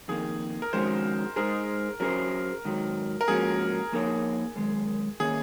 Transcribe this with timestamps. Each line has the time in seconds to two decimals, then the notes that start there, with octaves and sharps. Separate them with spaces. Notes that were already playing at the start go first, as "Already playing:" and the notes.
0.08 F2 D#3 A#3 G#4
0.62 A#4
0.73 F2 D#3 G#3 C#4 F#4 C5
1.36 G#3 D#4 G#4 A#4 C5
2.00 F#3 C#4 G#4 A#4 C5
2.65 G#2 D#3 F#3
3.21 A#4
3.28 G#2 F3 A#3 C#4 F#4 G#4
3.92 F3 A#3 D#4 A#4 C#5
4.56 F#2 D#3 G#3
5.20 D#3 A#3 C#4 G#4